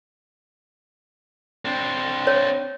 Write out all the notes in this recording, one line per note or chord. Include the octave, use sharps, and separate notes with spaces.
C4 D4
C#5